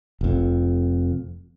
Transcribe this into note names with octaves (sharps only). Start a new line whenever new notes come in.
F1 F2